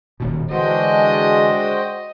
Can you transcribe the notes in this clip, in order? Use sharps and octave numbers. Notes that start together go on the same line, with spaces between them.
D#1 D#2 B2
D3 E3 G#3 D4 F#4 C5 D#5 G5